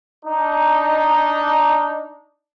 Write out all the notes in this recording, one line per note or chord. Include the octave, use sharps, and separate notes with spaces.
D4 D#4